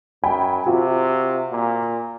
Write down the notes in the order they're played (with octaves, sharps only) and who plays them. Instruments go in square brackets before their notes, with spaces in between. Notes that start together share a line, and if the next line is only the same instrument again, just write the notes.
[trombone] F#2 [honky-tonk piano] G5 G#5 B5
[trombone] C3 [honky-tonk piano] F4 F#4
[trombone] A#2